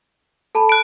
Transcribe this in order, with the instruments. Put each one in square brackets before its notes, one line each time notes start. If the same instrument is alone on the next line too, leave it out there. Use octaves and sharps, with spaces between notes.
[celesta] A4 A5 B5
[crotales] F#6 D7